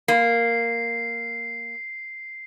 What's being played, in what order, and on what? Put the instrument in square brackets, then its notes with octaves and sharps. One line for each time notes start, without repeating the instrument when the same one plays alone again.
[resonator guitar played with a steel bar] A#3 [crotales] C7